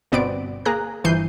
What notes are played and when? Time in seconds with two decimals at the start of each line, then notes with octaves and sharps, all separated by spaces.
0.12 G1 B2 B3 C4 D5 D7
0.65 A#3 G#4 A#5 F#6
1.04 G1 E3 F3 G6 C7 D#7